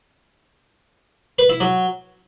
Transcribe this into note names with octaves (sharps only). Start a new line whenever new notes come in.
B4
E4
F#3